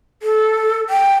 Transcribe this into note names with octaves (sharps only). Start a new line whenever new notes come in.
A4
G5